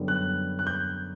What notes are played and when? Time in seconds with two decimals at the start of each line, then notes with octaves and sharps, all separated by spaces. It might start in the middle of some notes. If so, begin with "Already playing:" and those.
Already playing: F#2 D3 G3 B3
0.08 F#6
0.59 F#6
0.67 G6